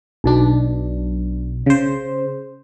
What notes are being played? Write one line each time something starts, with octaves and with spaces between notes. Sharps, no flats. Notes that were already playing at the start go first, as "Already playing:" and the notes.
B1 B2 D4
C#3 C5